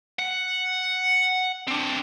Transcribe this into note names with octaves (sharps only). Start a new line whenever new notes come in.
F#5
C4 D4